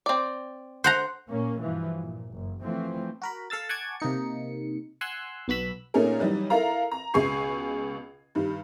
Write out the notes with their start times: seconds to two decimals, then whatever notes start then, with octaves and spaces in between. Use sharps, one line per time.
0.06 C4 D5
0.84 C5 F#5 A#5
1.29 A#2 A#3 C#4
1.61 G2 B2 E3 F3
2.00 A#2
2.33 F#1
2.62 E3 F3 A3 C4
3.22 F#4 A#4 B5
3.50 A4 F5 E6 A6
3.69 F#5 G#5 A5 C#6 D6 G#6
4.00 C3 A#3 D#4 C#7
5.01 F#5 G#5 C6 E6 F#6
5.48 B1 B3 F#4 B5 E6
5.94 A#2 A3 C#4 D#4 G#4 A#4
6.19 E3 F#3 G3 D#4
6.50 E4 A4 A#4 F5 A#5
6.91 A#5
7.14 C#2 B2 G#4 G#5 C#6 C7
8.35 G2 D#3